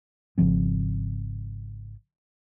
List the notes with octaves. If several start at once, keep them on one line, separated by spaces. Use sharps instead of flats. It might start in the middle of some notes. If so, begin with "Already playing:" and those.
G#1 C#3 F3 C4